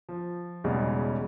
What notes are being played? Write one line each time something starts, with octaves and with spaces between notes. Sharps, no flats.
F3
B1 E2 C#3 G3 G#3